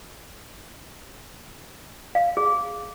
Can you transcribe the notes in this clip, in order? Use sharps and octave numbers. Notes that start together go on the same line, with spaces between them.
F5
G#4